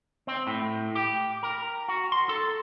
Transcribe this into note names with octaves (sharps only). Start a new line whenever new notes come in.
C4
A2
G4
A#4
F#4
C6
A4